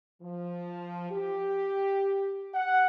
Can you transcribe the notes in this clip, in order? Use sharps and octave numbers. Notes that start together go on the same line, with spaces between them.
F3
G4
F#5